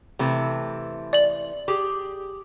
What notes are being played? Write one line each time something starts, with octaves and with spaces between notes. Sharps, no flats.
C3 E3 A3
D5 F#7
G4 G#4